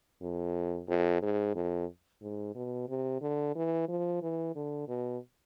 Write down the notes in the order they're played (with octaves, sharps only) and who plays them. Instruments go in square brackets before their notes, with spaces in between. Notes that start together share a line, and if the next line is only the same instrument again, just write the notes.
[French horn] F2
F2
G#2
F2
G#2
B2
C3
D3
E3
F3
E3
D3
B2